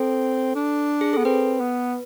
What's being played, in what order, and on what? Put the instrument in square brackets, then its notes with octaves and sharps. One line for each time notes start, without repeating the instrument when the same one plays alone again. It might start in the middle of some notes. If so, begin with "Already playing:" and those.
Already playing: [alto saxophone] C4 [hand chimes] A4
[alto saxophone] D4
[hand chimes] G#4
[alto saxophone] B3 [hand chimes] A4
[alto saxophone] C4 [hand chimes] B4
[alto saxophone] B3